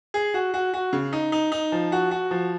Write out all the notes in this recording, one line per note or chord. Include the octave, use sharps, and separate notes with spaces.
G#4
F#4
F#4
F#4
C#3
D#4
D#4
D#4
F3
F#4
F#4
F3